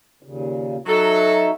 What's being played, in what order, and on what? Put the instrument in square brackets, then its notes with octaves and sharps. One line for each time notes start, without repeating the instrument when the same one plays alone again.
[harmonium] D#2 A#2 C#3
[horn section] F#3 A4 [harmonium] D#4 F#4 E5